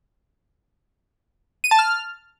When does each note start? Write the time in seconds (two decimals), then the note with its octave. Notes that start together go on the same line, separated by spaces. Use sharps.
1.64 D#7
1.71 A5
1.79 F6